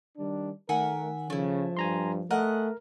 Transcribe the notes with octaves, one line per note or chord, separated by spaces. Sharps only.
D#3 G3 D4
D#3 A3 A#4 E5 F#5 G#5
C#3 F3 A3 E4
G2 G#5 A#5 C6
A3 G#4 A#4 D#5 F#5